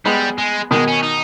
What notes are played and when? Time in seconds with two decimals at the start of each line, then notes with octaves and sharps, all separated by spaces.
0.05 G3 G#3 B3
0.38 G#3
0.71 B2 D#3 G#3
0.88 C#4
1.03 D#4